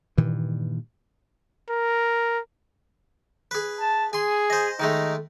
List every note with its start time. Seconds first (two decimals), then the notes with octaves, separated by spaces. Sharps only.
0.17 G2 A#2 D#3 E3
1.70 A#4
3.51 G#4 B4
3.80 A5
4.13 G#4 G#5 C6
4.50 C5 D#5
4.80 D#3 G#3 A3 D#4